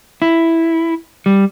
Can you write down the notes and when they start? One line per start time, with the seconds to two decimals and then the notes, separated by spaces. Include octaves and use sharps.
0.22 E4
1.26 G3